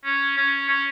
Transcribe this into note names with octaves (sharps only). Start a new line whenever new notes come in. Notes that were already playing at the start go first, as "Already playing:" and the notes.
C#4
C#4
C#4